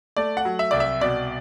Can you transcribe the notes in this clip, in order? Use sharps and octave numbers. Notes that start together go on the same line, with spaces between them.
A3 D5
F#5
F#3
E5
C2 D5
E5
B2 D5